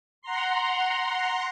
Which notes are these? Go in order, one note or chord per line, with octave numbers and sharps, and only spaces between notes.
F#5 A#5 C6